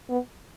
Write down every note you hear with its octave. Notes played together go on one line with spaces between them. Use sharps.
B3